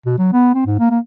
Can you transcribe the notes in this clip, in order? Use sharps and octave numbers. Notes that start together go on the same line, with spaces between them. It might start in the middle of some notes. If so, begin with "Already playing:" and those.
B2
F#3
B3
C4
G#2
A#3
A#3